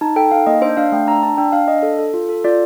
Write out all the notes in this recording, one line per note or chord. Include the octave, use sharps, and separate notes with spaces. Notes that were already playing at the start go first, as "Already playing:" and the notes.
D#4 A5
A4 G5
D#4 F5
A#3 D#5
D4 C5
D4 F5
A3 G5
D4 A#5
D4 A5
D4 G5
D4 F5
D4 D#5
A4
A4
F4
A4
F4 D5